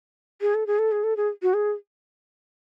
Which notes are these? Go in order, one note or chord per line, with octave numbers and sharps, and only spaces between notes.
G#4
A4
G#4
A4
G#4
A4
G#4
F#4
G#4